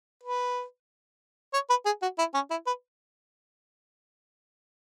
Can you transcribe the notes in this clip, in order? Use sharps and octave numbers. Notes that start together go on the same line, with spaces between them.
B4
C#5
B4
G#4
F#4
E4
C#4
E4
B4